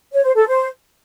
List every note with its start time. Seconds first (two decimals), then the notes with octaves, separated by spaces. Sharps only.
0.13 C#5
0.24 C5
0.36 A4
0.47 C5